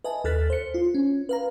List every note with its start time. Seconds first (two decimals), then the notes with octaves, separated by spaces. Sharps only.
0.04 B4 D#5 E5 G#5 A5
0.24 D#2 A4 F6 F#6 A6 B6
0.50 C5 C#7
0.74 F4
0.95 C#4
1.29 B4 F5 A#5